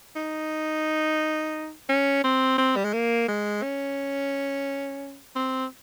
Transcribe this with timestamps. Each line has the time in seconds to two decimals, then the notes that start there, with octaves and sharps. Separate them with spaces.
0.16 D#4
1.89 C#4
2.24 C4
2.58 C4
2.76 G3
2.85 G#3
2.93 A#3
3.28 G#3
3.62 C#4
5.36 C4